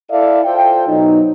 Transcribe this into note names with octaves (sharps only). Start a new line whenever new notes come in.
E4 A4 D5 E5 F5
F4 A4 C5 G5
B2 F#3 D#4